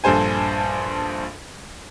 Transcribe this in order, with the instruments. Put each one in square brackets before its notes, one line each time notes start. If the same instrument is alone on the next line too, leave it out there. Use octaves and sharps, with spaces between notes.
[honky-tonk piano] A#1 G2 A4 C5 G#5